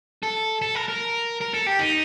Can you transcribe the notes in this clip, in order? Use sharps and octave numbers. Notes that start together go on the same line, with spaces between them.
A4
A4
A#4
A#4
A#4
A4
G4
D#4